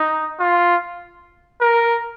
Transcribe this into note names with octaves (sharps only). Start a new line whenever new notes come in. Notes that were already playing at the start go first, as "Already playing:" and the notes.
Already playing: D#4
F4
A#4